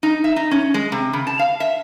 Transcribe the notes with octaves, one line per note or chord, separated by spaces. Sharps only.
D#4
E5
D#4
C#4
G#3
C3
C#3
A5
F5
E5